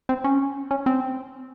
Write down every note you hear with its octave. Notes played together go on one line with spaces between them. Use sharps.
C4
C#4
C#4
C4